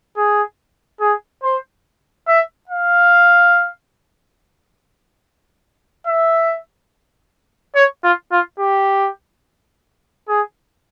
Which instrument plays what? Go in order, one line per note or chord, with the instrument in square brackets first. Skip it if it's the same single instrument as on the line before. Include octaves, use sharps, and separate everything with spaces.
[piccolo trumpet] G#4
G#4
C5
E5
F5
E5
C#5
F4
F4
G4
G#4